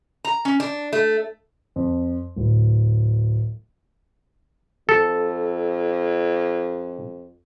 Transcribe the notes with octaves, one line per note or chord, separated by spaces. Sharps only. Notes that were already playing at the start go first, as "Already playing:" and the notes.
A#5
C#4
D4
A3
F2
D1
F2 A4